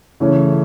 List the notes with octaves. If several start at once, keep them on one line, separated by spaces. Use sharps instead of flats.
C#3 E3 A3 C#4